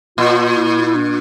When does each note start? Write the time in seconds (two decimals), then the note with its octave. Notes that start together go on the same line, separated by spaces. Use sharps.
0.18 A#2 F4
0.56 E4
0.86 E4
0.95 D4